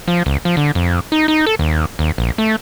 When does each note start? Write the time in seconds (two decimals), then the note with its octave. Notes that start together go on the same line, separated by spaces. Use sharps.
0.08 F3
0.26 C#2
0.45 F3
0.57 D3
0.75 F2
1.12 D#4
1.28 D#4
1.46 A4
1.59 D#2
1.99 D#2
2.18 A#1
2.38 A3